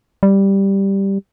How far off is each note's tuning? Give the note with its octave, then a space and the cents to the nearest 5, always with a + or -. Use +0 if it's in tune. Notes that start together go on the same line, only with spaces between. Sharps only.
G3 +0